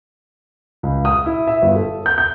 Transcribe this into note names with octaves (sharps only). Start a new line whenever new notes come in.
C#2
D#6
E4
E5
G1
A4
G6
G6